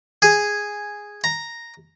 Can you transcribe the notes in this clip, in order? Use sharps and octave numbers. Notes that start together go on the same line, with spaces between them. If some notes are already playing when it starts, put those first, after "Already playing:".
G#4
A#5